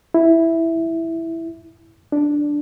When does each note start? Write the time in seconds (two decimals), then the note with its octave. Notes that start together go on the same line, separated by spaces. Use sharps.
0.14 E4
2.12 D4